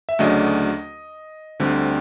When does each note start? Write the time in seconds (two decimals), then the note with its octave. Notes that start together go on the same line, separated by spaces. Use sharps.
0.09 E5
0.19 D2 C#3 F#3 A3 D4 D#5
1.60 D2 D3 G3 C4